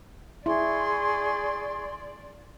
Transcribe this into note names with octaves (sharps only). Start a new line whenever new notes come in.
E4 G#4 D5 C6 C#6